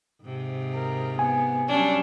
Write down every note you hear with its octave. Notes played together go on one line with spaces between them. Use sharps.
G#2 C3
A#4
B3 G#5
F#3 G3 C#4 D4